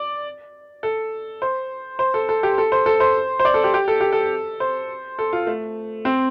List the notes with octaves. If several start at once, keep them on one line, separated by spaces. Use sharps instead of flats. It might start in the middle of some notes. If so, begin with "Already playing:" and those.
Already playing: D5
A4
C5
C5
A4
A4
G4
A4
C5
A4
C5
C5
D5
A4
G4
G4
A4
G4
A4
C5
A4
F4
A3
C4